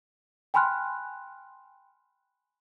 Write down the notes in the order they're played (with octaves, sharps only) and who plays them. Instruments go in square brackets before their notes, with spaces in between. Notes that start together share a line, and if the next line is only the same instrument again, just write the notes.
[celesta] G5 G#5 B5 C6 F6 F#6